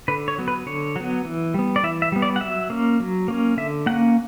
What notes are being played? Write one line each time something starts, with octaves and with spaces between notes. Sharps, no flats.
D3 B4
C#5
F#3 B3
B4
D3 C#5
F#3 B3
E3
G3 B3
D5
E3 E5
E5
G3 B3
D5
F#5
F#3 E5
A#3 C#4
F#3
A#3 C#4
D3 E5
A#3 C#4 F#5